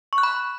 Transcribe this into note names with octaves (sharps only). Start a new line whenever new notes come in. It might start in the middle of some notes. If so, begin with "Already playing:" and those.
C#6
F#6
B5